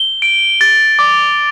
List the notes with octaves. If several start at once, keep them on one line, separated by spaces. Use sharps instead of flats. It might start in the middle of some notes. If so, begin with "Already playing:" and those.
Already playing: G7
D7
A6
D6